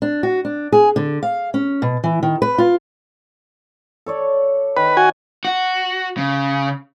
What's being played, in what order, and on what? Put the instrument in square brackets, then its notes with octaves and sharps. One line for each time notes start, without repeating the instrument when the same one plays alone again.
[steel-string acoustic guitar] D4
F#4
D4
G#4
D3
F5
C#4
B2
E3
D#3
B4
F4
[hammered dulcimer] A4 C#5 D5
[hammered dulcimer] D#3 [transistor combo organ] B4
[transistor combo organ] F#4 G#5
[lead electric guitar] F#4
C#3